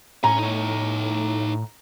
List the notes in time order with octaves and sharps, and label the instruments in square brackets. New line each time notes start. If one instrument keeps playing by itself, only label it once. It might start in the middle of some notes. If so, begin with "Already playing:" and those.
[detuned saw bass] A2 [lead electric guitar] C#4 G#5 [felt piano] A#5
[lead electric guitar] D#4 C#5